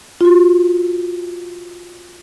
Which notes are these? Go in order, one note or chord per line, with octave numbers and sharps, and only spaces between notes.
F4 F#4